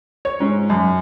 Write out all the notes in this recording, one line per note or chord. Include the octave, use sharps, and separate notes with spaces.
C#5
G#2
F#2